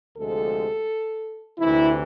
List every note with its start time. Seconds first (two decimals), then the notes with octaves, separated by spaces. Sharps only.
0.17 D2 C3 F3 G#3 A4
1.58 D2 C3 E3 E4